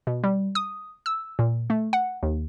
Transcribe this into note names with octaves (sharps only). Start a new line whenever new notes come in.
B2
G3
D#6
E6
A#2
A3
F#5
D#2